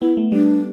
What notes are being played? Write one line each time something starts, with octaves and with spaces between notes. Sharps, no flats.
B3 E4
A3
G3 D4